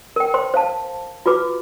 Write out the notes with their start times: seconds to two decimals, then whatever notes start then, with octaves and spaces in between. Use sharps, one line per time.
0.16 A#4 G5
0.34 C5 C6
0.54 C5 F5 A5
1.26 F4 F#4 B4 D6